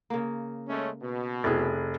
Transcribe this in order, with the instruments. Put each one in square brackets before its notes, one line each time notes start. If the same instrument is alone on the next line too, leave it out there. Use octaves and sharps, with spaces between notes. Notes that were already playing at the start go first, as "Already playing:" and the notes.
[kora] C#3 A#3
[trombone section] G#3 A3 C#4
B2
[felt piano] F1 G#4 [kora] E4 B4